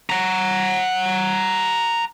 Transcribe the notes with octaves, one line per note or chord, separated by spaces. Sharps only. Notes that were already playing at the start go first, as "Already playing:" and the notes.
F#5 A#5